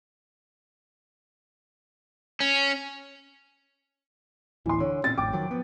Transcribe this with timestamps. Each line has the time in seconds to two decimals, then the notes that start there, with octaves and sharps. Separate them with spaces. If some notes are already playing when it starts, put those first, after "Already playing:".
2.40 C#4
4.66 D1 A1 E3 C6
4.80 D3 C#5
5.04 A#2 C4 C#4 A6
5.17 G#1 F2 A2 G5 D6
5.33 D#3 F3 F#3
5.48 F3 B3